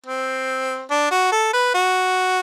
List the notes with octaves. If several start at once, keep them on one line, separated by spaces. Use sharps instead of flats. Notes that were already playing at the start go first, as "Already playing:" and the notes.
C4
D4
F#4
A4
B4
F#4